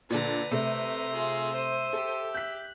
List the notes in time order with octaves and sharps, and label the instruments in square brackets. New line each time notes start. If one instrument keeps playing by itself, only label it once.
[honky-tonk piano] A#2 D3 [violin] B4 [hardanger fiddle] D5 A#5
[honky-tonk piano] C3 A3 [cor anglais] E5 [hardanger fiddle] A#5 C6
[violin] F4 G#4
C5 D#7
[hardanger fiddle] G4 [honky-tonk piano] A4
[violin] F#6 [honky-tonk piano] G6 B6